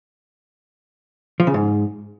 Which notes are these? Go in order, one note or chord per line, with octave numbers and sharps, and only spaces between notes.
F3
C#3
G#2